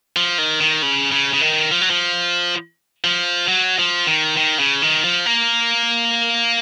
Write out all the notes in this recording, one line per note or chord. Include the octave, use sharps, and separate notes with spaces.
F3
D#3
D#3
C#3
C#3
C#3
D#3
F3
F#3
F3
F3
F#3
F3
D#3
D#3
C#3
D#3
F3
A#3